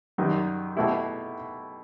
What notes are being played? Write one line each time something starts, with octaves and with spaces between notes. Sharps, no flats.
F#2 D#3 G3
B2 A3 E4 G4